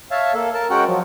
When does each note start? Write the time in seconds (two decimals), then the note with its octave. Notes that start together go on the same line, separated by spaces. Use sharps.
0.11 C#5 E5 F5 A5
0.34 A#3 A4
0.54 A#4 A5
0.70 G#3 C#4 F#4 A#4 F#5 G5
0.87 F3 F#3